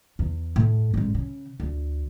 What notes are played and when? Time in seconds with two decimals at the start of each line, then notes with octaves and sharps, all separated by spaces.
0.19 E2
0.56 A2
0.94 A1 G#2
1.15 C#3
1.60 D2